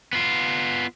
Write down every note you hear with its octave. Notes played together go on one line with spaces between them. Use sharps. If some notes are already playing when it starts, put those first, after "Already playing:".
B3 F4